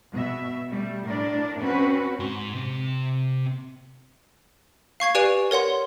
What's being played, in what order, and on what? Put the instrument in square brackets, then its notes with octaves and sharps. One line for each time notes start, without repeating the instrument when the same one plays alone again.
[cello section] B2 E5
G3 A3
A2 D4 A#4 D5
C4 C#4 F#4 B4
[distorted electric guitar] G#2 C6
C3 C4
[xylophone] F5 C#6 G#6 C7
G4 B4 D5 G#5 D7 F7
A#4 C#5 F#5 C6